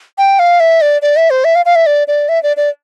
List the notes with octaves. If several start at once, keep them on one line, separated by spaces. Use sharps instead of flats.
G5
F5
E5
D5
D5
E5
C5
E5
F5
F5
E5
D5
D5
E5
D5
D5